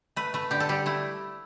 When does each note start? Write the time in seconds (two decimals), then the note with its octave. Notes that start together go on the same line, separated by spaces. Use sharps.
0.16 A3 B4
0.34 A3 B4
0.51 D3 G4
0.60 A4
0.69 G3 G4
0.86 A3 E4